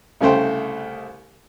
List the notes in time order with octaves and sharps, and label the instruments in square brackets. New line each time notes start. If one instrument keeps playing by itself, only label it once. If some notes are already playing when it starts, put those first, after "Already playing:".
[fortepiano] C2 C#3 A3 C5 G5